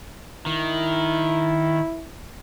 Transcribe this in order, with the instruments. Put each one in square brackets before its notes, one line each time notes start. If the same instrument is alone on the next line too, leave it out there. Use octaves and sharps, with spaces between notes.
[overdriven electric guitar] D#3 [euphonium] E4